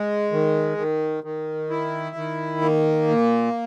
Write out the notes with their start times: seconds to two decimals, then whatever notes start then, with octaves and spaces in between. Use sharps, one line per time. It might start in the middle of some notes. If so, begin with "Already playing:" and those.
Already playing: G#3
0.32 D#3
0.78 D#3
1.24 D#3
1.70 E4
2.16 D#3
2.61 A#3
3.08 A#2